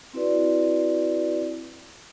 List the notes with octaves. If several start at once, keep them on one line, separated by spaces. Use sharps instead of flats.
C4 E4 F#4 B4 D5